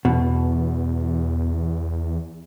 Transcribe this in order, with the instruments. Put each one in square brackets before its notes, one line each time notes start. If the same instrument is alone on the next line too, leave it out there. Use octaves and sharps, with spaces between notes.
[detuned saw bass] E2 [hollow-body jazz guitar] B2